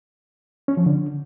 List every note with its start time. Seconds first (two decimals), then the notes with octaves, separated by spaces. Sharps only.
0.68 C#4
0.77 F3
0.86 D3